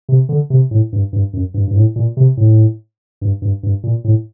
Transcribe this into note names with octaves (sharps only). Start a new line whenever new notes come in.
C3
D3
C3
A2
G2
G2
F#2
G2
G2
A2
A#2
C3
A2
G2
G2
G2
A#2
A2